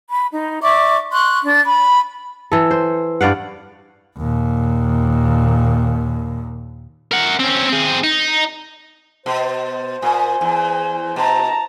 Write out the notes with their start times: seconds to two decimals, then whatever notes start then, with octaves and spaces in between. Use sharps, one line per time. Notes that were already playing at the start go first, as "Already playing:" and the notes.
0.11 B5
0.32 D#4
0.63 D5 E5 C#6 D6
1.12 C6 C#6 F#6
1.43 D4
1.67 B5
2.52 E3 A4
2.71 C5
3.21 G2 D5 F5 F#5
4.18 D#2 A#2
7.12 A#4 F#5
7.40 C4 C#4
7.70 C4 G#4
8.04 D#4
9.26 B2 C5
10.02 A#2 G#5
10.41 E2
11.16 B2 A5 A#5